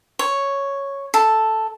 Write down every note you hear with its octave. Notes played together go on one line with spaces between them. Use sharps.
C#5
A4